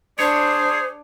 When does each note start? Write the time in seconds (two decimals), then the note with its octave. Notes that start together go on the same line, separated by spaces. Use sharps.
0.19 D4 G#4 C5 C#5